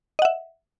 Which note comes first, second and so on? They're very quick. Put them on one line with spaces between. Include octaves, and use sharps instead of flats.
D#5 F#5 E5